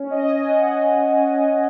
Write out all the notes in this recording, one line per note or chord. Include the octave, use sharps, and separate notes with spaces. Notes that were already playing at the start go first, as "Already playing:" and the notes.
Already playing: C#4
D#5
G#5
F#5